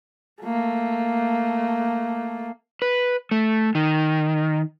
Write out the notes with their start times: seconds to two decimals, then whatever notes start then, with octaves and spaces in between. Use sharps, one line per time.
0.42 A3 A#3
2.82 B4
3.31 A3
3.75 D#3